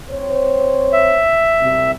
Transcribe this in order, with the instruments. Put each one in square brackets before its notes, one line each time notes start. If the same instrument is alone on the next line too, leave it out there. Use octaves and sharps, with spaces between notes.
[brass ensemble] C4 C5 C#5
[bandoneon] E5
[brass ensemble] C2 C3